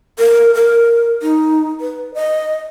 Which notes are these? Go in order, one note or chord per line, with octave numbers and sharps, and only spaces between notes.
A#4
A#4
D#4
B4
D#5